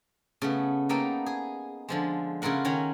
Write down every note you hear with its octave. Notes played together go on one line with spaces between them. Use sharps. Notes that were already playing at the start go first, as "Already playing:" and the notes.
C#3 A3 B3
A#3 B3 D#4 A4 G5
G#4
D3 F3 G#3
C#3 E4 F4 A#4 F#5
D#3 C#4 C#5 A#5